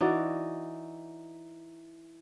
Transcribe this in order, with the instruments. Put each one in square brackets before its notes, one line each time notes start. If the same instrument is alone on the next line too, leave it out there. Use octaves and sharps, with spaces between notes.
[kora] E3 D#4 F#4 D5